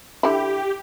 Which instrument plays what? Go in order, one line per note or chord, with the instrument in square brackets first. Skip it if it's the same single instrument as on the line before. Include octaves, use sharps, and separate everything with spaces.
[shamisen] D3 E4 [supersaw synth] G4